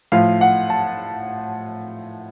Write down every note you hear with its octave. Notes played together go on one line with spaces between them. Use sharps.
A2 F3 F5
F#5
A5